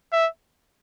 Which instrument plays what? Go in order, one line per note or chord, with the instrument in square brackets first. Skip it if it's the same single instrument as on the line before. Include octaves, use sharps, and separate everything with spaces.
[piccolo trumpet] E5